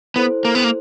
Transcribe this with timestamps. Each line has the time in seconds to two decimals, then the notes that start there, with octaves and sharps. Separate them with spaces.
0.16 B3 E4 A4 C5
0.45 A#3
0.55 B3
0.64 A#3